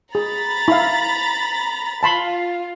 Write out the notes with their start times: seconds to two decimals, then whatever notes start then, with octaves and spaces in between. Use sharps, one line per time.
0.15 G#4 A#5 B5 A6
0.68 E4 F5
2.03 F4 A5 B5 C6